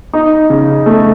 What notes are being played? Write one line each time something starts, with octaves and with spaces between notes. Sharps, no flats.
D#4
C#3
A3